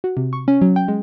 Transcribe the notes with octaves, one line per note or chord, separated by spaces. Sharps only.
F#4
C3
C#6
C#4
F#3
G5
G#3